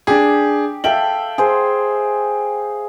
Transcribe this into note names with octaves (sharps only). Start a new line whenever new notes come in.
D4 G4 G#4
A4 E5 F5 G5 F#7
G#4 C5